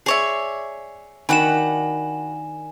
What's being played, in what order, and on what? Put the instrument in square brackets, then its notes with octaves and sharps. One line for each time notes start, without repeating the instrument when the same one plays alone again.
[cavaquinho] G#4 C#5 E5 [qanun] D5
[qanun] D#3 D4 [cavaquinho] F#4 F#5 B5 [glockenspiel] G#5 E7